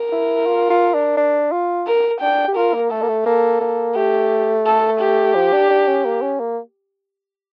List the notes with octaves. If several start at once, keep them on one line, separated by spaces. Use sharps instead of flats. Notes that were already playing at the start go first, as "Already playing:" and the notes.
Already playing: A#4
E4
F4
F4
D4
D4
F4
A#4
D4 G5
G4
F4 A#4
A#3
A3 A4
A#3
A3
A#3 A4
A#3
A3 G4
A4
G4
F3
D4
D4
C#4
A#3
C#4
A#3